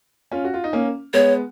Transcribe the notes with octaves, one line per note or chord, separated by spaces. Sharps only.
C#4 F4
F#4
F4
D#4
A#3 C#4
G#3 B3 C#5